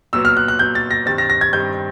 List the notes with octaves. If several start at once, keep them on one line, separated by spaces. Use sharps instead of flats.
A#2 F#3 B3 E6
F6
F#6
F#6
A#2 F#3 B3 G6
A6
A#6
G2 D#3 G3 C4 A6
A#6
A#6
G#6
G2 D#3 G3 C4 G6